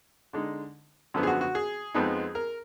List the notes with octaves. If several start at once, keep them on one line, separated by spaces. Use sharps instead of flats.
D3 G#3 D#4
F#2 D3 F3 B3
G#4
F#4
F#4
G#4
F2 F3 G#3 B3 D#4
A#4